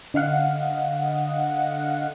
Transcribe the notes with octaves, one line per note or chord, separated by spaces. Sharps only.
D3 D#5 F5 F#5